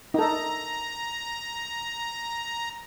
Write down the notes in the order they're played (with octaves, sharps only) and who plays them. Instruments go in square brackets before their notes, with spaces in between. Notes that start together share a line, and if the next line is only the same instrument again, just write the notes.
[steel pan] D#4 A4 [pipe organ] A#5